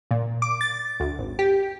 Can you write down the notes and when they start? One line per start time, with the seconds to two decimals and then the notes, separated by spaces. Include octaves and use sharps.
0.11 A#2
0.42 D6
0.61 A6
1.00 D2
1.19 G#1
1.39 G4